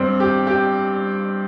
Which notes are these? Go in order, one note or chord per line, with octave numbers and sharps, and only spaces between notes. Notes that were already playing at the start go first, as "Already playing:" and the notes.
Already playing: G2 C4
G4
G4